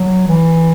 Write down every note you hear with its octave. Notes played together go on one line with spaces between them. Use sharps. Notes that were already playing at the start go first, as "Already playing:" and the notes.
Already playing: F#3
E3